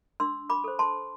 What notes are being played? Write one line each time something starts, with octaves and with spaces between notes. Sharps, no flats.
D4 C6 E6
B5 D6
A4 C5
A5 C6